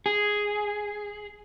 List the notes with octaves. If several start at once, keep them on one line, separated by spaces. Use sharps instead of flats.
G#4